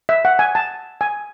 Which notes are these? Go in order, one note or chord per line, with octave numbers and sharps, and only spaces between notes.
E5
F#5
G#5
A5
G#5